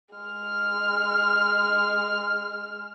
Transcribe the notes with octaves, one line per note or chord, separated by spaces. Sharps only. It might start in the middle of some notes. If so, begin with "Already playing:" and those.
G#3 F6